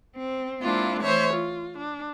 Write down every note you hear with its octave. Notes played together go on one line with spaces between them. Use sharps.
C4
G#3 A#3 C4 D4 E4 F4
E3 A3 C5 C#5 E5
F4
D4